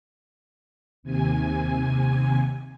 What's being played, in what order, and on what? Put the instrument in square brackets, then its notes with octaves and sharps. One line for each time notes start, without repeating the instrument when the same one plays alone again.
[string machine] D#2 C3 G#5